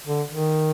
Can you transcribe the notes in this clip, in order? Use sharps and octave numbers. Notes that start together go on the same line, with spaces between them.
D3
D#3